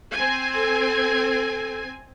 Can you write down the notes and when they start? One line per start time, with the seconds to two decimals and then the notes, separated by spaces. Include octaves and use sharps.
0.12 C4 G#5
0.54 A4